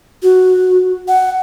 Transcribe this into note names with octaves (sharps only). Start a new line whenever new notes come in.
F#4
F#5